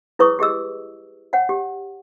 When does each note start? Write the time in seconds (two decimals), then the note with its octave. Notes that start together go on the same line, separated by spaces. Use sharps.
0.19 E4 G#4 B4 C#5 C#6 D#6
0.39 G4 G#4 D#5 E6
1.33 C#5 F#5 G5
1.49 G4